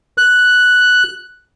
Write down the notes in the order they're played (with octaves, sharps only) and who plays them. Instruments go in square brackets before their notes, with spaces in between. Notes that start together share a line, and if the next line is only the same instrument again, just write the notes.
[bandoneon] F#6